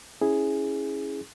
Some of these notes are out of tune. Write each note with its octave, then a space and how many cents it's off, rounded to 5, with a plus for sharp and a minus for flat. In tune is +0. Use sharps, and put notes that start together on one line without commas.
C#4 +0 E4 -10 G#4 +0